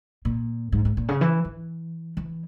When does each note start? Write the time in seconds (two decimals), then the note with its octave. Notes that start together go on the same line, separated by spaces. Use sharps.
0.25 A#2
0.72 G#2
0.85 G#2
0.97 A#2
1.08 C#3
1.21 E3
1.45 E3
2.17 E3